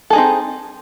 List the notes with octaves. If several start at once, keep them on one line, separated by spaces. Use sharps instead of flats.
C4 D#4 G#4 A4